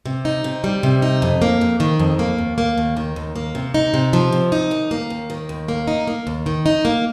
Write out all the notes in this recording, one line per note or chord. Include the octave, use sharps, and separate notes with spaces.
C3
D#4
C3
G3
C3
D#4
F2
A#3
F2
D#3
F2
A#3
D#2
A#3
D#2
D#3
D#2
A#3
C3
D#4
C3
F3
C3
D#4
D#2
A#3
D#2
D#3
D#2
A#3
D#4
A#3
D#2
D#3
D#4
A#3